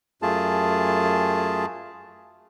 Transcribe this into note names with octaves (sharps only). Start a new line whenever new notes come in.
F#2 A3 F4 G#4 A5